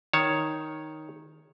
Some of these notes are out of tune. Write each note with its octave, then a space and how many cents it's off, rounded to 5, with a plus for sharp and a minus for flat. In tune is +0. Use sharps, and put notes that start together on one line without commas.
D#3 +0 C#5 +0 A5 +0